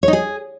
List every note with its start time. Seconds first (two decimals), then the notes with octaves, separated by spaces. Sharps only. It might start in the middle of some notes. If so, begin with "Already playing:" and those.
0.03 C#5
0.08 D#4
0.13 G#4